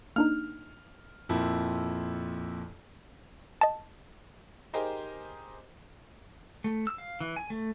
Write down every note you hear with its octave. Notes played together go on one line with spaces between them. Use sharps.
A#3 D4 D#4 F6
F2 A#2 E4
D#5 A5
D#4 G4 G#4 A#4 C5 D#5
A3
E6
F5
E3
G#5
A3